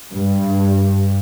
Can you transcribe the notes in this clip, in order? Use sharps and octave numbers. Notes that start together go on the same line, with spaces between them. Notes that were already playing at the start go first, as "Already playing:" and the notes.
G2